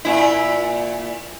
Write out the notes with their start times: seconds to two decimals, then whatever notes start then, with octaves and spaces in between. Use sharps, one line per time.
0.05 A#2 E4